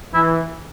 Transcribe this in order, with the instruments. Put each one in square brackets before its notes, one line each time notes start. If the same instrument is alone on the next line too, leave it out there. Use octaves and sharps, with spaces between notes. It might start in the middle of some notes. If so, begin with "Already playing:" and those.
[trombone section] E3 [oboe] E4